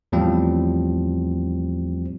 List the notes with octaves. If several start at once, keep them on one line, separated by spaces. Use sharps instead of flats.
E2 A2 F3 G3 C4